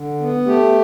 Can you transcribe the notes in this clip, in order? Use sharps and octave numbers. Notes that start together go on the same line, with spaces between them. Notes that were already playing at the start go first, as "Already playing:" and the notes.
Already playing: D3
B3
A3 G4